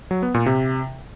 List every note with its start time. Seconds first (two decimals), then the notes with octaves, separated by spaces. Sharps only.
0.11 F#3
0.23 B3
0.34 A#2
0.46 C3